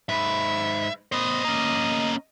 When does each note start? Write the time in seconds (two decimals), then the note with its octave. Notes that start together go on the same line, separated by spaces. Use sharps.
0.09 G#2 B4 E5
1.12 B3 C5 D#5
1.45 A#3 C#4